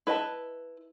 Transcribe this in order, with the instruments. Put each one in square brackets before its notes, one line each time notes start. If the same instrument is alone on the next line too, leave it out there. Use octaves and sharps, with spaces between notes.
[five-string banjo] E4 B4 D#5 G#5 A5